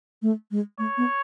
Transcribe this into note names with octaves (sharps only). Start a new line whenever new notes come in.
A3
G#3
A3 C#5
B3